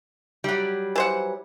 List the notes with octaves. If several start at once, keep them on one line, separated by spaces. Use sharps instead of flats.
F#3 G3
E3 C5 F#5